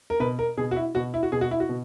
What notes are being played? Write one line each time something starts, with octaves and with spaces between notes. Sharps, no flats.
A#4
B2 B4
A#4
B2 G#4
F#4
E4
B2 F#4
E4
F#4
B2 G#4
F#4
E4
F#4
B2